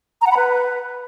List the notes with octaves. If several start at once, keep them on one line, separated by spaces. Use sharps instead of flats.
A#5
F#5
B5
B4